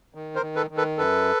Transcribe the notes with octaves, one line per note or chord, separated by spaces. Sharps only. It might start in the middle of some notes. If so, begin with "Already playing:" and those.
D#3
A#4 C5
D#3
A4 B4
D#3
A4 B4
F#2 A4 B4